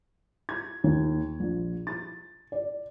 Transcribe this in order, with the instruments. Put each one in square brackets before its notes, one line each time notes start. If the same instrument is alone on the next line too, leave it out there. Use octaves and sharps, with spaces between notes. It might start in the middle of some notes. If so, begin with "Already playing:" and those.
[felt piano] G#6
D#2
A#1
A6
D5